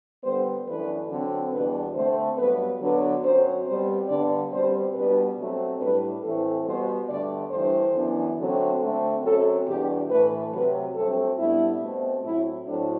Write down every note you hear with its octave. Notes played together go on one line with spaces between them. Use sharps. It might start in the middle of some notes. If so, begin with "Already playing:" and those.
D3 G3 B3 C5
F#2 E3 A3 D4 B4
D3 F#3 C4
E2 B2 G3 D4 B4
D3 A3 C4 C5
G2 F#3 B3 B4
D3 F#3 B3 D4 B4
F#2 F#3 C4 C5
B2 G3 C4 C5
G2 D3 G3 B3 D5
B2 G3 C4 C5
B2 G3 B3 D4 B4
B2 F#3 A3 C4
A2 G3 D4 B4
A2 E3 A3 C4 A4
B2 G3 B3 C5
G2 D3 A3 D5
G2 E3 A3 D4 C5
F#2 E3 B3 D4
D3 F#3 A3 C4
D3 A3 C4
F#2 F#3 C4 A4
E2 B2 G3 D4 G4
A2 E3 A3 B4
C3 F#3 C4 B4
G2 F#3 A3 C4 A4
A2 G3 B3 D4 E4
B2 A3 C4
A2 F#3 C4 E4
A2 F#3 A3 C4 D4